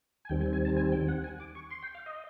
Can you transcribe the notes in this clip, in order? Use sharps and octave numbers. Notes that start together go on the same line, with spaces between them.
G#5
D#2 D#3 G3 C4 G5
G#5
G#5
A5
G#5
G5
F#5
G#5
D6
C#6
C6
G5
F5
D#5